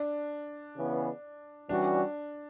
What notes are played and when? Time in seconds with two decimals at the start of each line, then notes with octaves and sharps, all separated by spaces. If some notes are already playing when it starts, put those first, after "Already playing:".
Already playing: D4
0.76 C#3 E3 B3
1.69 E3 G3 C#4 D4 F#4